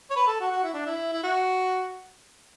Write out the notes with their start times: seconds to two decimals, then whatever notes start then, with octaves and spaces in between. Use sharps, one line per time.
0.11 C#5
0.16 B4
0.27 A4
0.40 F#4
0.51 F#4
0.63 E4
0.74 D4
0.86 E4
1.13 E4
1.24 F#4